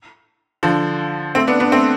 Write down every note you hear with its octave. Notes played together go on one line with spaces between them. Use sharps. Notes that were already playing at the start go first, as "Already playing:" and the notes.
D3 F3
A3 C4
B3 D4
B3 D4
A3 C4